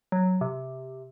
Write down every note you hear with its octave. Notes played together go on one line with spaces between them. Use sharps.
F#3
C3